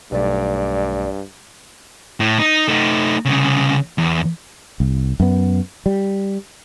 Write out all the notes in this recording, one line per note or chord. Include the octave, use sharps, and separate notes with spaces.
B1 G2 A3 D5
A2
D#4
A3 D#4
C2 C#3
E2
C2
F#2 B3
G3